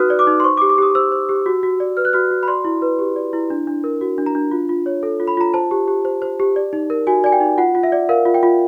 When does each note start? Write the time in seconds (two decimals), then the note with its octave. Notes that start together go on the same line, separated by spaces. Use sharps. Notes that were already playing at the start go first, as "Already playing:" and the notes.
Already playing: D#4 F#4 B4 D#6 F6 F#6
0.10 D5
0.19 D6
0.27 D#4
0.40 C6
0.44 C5 C#6
0.57 D6
0.62 G4
0.69 D6
0.78 G4 D#6
0.95 C5 E6
1.12 C5
1.29 G4
1.46 F#4
1.63 F#4
1.80 D5
1.97 B4 F6
2.05 F#6
2.13 F#4 F6
2.31 F#4
2.43 B5
2.48 D5 C6
2.65 E4
2.82 B4
2.99 G4
3.16 D5
3.33 E4
3.50 D4
3.67 D4
3.84 A#4
4.01 F#4
4.18 D4
4.26 A#5
4.35 D4
4.51 F4
4.69 F4
4.86 C#5
5.03 A4
5.20 F4
5.28 B5
5.37 F4 A#5
5.54 C5 A5
5.71 G4
5.88 G4
6.05 C5
6.22 C5
6.40 G4
6.56 D5
6.73 D#4
6.90 A#4
7.07 F#4 G#5
7.24 D5 G#5
7.32 G5
7.41 D#4
7.58 F4 F#5
7.75 F4
7.83 E5
7.92 D5
8.09 A#4 F5
8.26 F4
8.34 G5
8.43 F4